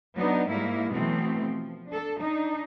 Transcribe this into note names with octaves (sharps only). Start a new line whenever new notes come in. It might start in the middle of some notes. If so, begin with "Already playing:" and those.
F#3 B3 D4 D#4
G#2 G3 A#3 E4
B2 E3 F#3 A3 B3 C4
F3
D4 A4
D4 D#4